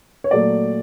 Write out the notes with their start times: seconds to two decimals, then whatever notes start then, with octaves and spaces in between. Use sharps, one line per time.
0.24 C#5
0.31 A#2 F#3 A3 D5